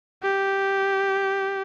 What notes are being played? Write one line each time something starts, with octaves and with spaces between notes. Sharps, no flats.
G4